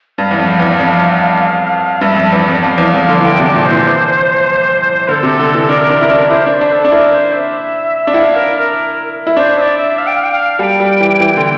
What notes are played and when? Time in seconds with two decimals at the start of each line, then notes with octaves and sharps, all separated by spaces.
0.18 G2 F5
0.31 E2
0.39 F2
0.59 E2
0.79 F2
2.01 G2 E5
2.17 F2
2.32 E2
2.48 F2
2.63 F2 F5
2.78 E2
2.94 F2
3.09 D3
3.21 E3
3.24 D3 G5
3.39 C3
3.45 A5
3.54 A#2
3.65 C5
3.70 E3
3.86 E3
5.08 D3 A4 A#4
5.23 C3
5.39 D3
5.54 E3
5.69 D4 A#4
5.90 D4
6.01 E4
6.11 D4
6.30 E4 C5
6.46 D4 D5
6.54 C5
6.61 D4
6.72 A4
6.84 D4
6.92 E4 A#4
7.13 C5
7.33 E5
8.07 D4
8.14 E4 G5
8.19 F5
8.35 A#4
8.56 A#4
9.27 E4
9.37 D4 C5
9.57 E5
9.61 D5
9.78 E5
9.98 F5
10.07 G5
10.15 F5
10.24 G5
10.32 F5
10.59 G3 A5
10.63 G5
10.80 G3
11.00 E3
11.20 E3
11.37 D3